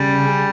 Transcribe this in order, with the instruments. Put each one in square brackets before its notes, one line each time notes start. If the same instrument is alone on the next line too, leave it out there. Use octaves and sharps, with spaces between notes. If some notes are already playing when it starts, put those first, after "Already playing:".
Already playing: [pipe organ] C#3 C#4 [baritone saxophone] G3